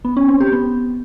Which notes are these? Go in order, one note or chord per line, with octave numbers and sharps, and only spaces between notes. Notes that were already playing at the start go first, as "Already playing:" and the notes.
B3
C#4
C4
G4
B3